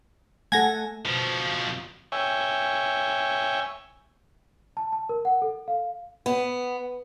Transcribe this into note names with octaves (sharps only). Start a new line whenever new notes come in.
A3 A4 F#5 G#5 G#6 A#6
B2 F3
C#5 E5 G5 G#5
A5
A5
A#4
F#5
A4
F5
B3